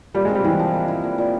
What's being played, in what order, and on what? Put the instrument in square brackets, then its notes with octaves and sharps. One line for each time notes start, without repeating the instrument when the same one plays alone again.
[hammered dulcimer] A#2 [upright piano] G3
[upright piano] G#3
[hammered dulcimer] C4
[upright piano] G3
[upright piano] E3 [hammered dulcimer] G4
[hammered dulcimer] F3
A#4
E4
A#2
A#2